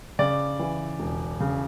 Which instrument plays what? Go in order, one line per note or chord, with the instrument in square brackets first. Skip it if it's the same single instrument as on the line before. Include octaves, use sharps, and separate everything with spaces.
[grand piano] C#3 D5
E3
E1
C#3